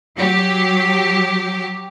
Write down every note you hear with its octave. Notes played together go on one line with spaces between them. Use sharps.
F#3 G4